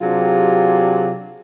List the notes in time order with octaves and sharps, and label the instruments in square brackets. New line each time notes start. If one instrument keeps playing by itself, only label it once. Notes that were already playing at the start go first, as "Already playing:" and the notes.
[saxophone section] C3 F#3 D4 F4 G4 G#4